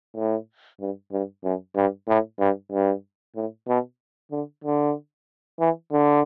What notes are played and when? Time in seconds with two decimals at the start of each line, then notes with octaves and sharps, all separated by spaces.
0.16 A2
0.80 G2
1.12 G2
1.44 F#2
1.76 G2
2.08 A2
2.40 G2
2.72 G2
3.36 A2
3.68 B2
4.32 D3
4.64 D3
5.60 E3
5.92 D3